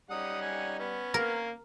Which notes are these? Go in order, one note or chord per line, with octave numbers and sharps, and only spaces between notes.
G3 C#4 D#4 F#5 D#6
G#5
B3 C#4
A#3 A#4